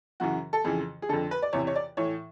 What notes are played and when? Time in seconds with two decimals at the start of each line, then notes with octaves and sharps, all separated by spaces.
0.20 F#2 C#3 E3 F#4
0.53 A4
0.65 F2 C#3 E3 G#4
1.02 G#4
1.09 F2 D3 A4
1.31 B4
1.42 D5
1.53 E2 C3 E3 C#5
1.67 C#5
1.75 D5
1.97 A2 E3 C#5